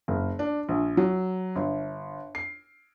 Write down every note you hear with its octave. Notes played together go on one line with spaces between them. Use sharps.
F#1
D4
A#1
F#3
G1
C7